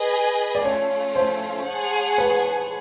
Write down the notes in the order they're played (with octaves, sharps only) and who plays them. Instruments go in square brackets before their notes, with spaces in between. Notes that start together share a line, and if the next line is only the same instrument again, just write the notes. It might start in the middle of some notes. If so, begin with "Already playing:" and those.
Already playing: [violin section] G#4 B4 D#5 G#5
[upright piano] D5
[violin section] A3 C#4 F4 [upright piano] C#5
[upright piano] C5
[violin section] G#4 C#5 F#5 A5
[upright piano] B4